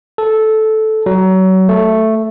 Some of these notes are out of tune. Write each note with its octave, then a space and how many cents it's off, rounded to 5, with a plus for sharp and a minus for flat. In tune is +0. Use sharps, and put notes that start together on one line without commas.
A4 -10
F#3 +25
A3 +5